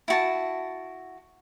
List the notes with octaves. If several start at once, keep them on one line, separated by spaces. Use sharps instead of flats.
E4 F#4 A5